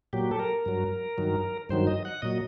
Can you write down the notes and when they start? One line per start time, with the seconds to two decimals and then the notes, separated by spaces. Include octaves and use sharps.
0.13 A#2 F#3 G4
0.31 A4
0.40 A#4
0.66 G2 F#3
1.18 G2 D#3 F#3
1.69 G2 D#3 F#3 C5
1.87 D#5
2.05 F#5
2.22 A#2 F#3 D#5